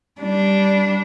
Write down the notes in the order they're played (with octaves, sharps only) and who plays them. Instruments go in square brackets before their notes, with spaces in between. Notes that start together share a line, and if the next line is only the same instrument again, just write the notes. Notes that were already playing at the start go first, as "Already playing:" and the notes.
[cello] G3 D4